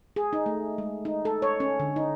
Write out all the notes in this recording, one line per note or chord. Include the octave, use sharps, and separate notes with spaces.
G#4
D#4
A3
G#3
D#4
A4
C#5
C#4
D3
D#4